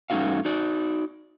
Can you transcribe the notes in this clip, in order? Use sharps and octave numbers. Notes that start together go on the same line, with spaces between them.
G2 A3 C#4 D#4 F#4 F5
D#4 F#4 D5